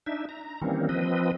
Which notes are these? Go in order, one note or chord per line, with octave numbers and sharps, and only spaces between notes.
D4 D#4 E5
A#5
D#3 E3 G3 A#3 C4 C#4
F3 C4 B4 D#5